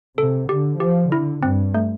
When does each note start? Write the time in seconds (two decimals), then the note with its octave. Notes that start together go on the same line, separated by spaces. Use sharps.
0.18 C3 A4
0.49 D3 G4
0.80 F3 G4
1.12 D3 E4
1.43 G2 C4
1.74 A3